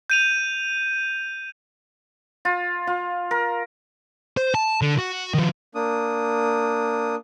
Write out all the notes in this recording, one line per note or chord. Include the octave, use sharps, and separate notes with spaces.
G6 D#7 F7
F4
F4
A#4
C5
A5
D3
F#4
D#3 F3
A#3 D4 D#6